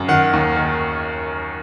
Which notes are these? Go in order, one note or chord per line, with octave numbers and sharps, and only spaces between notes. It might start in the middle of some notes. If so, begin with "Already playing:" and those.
Already playing: F#2
D#3 F#5
D#2
D#3